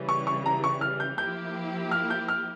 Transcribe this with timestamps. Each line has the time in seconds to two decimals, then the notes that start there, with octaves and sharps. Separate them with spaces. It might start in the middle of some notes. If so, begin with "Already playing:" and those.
Already playing: C#3 E3 G3
0.09 C#6
0.27 C#6
0.46 A#5
0.64 C#6
0.81 F6
1.00 G6
1.18 F3 A#3 E4 G4 G6
1.91 F6
2.10 G6
2.28 F6